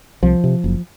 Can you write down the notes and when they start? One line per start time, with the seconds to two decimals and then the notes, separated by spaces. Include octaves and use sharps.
0.23 C2 F3
0.44 C3
0.64 F#1